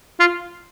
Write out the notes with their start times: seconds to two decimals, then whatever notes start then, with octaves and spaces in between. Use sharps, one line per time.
0.20 F4